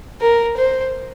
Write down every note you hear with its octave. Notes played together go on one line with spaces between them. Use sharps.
A#4
C5